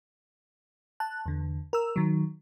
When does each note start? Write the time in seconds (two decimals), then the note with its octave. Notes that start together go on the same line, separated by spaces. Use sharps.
1.00 A5 F#6
1.26 E2 D3
1.73 A#4 E6
1.96 D#3 F#3